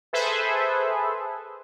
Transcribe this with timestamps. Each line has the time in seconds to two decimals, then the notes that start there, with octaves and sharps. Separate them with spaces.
0.13 G#4 A4 B4 C5 E5